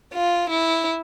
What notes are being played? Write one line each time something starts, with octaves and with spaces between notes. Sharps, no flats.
F4
E4